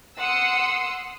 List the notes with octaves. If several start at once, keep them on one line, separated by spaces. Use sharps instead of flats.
F#5 C6 D#6 E6 C7 C#7